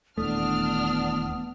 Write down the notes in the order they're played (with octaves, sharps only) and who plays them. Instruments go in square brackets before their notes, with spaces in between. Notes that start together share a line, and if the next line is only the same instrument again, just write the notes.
[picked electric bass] D#1 E2 A3 [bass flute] B3 [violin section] D4 F6 [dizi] D#6